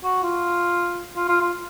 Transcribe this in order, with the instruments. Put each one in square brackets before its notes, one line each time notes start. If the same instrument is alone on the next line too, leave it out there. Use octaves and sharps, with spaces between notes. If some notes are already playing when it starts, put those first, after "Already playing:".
[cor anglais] F#4
F4
F4
F4
F4